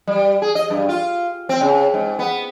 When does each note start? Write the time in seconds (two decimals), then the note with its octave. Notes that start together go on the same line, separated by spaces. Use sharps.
0.07 G3
0.42 G#4
0.55 D#5
0.70 G2
0.89 F4
1.49 C4
1.61 C#3
1.94 G#2
2.19 B3